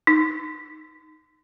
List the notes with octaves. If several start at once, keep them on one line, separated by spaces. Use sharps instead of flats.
D#4